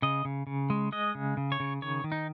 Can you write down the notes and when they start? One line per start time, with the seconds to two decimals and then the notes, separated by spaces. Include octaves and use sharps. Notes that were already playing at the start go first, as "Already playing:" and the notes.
0.02 C#3 D#5
0.25 C#3
0.47 C#3
0.70 G#3
0.92 G#3 D#5
1.15 C#3
1.37 C#3
1.52 C#5
1.60 C#3
1.82 D#3 C#5
2.04 D#3
2.12 D#4